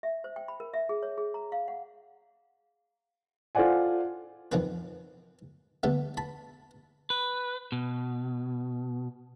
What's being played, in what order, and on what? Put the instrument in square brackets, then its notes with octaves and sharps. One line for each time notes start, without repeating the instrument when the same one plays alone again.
[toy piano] E5
C5
G5
B5
A#4
E5
G#4
C#5
G#4
A#5
F5
F#5
[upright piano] F4 A4 C5 D5 F#5 G#5
[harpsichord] F2 D#3 C4 B4
D3 G3 A3 B3
A5 B5
[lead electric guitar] B4
B2